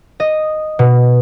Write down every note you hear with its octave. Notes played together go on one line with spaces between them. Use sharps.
D#5
B2